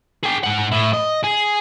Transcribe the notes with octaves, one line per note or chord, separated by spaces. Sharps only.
G#4 G5
G#2 F#5
A2 E4
D#5
G#4